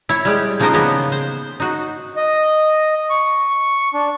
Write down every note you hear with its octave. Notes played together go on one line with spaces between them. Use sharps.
E4 C#5
G3 G#3 G4
C#3 F3 B3 D#4 A#4 C5
C#3 A#3 B3
C5
D#4 F#4
D#5
C#6
D4